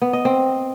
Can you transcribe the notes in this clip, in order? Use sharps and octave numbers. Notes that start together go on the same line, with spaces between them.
B3
D#5
C4